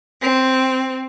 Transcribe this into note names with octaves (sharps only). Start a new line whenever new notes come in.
C4